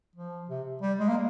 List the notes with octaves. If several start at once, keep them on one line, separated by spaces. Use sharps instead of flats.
F3
C3
G3
G#3
A#3